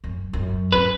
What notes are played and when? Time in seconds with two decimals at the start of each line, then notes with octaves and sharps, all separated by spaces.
0.04 F#2
0.33 F#2
0.72 C#4 B4